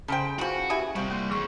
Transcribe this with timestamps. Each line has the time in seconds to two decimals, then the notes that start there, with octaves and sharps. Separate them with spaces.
0.08 C#3 A4 A#4 C5 G5 B5
0.39 E3 F3 F#4
0.70 B3 E4 G4 G#5
0.96 C3 F3 G3 F#4
1.11 A#3 C6
1.30 F2 E3 G#4 C#6